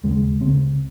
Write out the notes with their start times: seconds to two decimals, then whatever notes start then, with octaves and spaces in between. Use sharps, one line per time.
0.04 D#2 C#3 G#3
0.41 C#2 C#3 C4